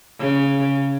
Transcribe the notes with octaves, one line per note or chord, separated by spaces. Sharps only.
C#3